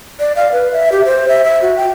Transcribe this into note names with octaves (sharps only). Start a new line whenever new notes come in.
D5
F5
B4
E5
G4
C5
E5
E5
F#4
G5